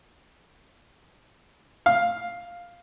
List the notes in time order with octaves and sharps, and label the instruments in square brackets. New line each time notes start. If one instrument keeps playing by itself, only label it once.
[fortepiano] F5